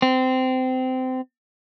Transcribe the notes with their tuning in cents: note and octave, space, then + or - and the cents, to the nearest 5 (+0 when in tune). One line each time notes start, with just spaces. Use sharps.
C4 -20